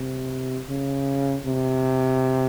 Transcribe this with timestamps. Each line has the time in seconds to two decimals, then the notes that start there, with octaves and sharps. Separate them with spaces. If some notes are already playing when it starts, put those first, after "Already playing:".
Already playing: C3
0.69 C#3
1.45 C3